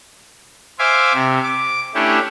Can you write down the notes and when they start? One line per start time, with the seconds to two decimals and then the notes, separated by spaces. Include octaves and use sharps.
0.79 C5 E5 F5 G#5 D6
1.14 C3
1.43 D6
1.94 A3 C#4 D4 E4 G4